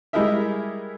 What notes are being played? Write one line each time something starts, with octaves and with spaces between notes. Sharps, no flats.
G3 G#3 E4 A#4 D#5 E5